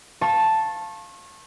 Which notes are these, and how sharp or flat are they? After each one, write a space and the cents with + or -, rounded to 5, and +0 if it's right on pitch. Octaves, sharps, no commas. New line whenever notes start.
F5 +0 A5 +0 C#6 -35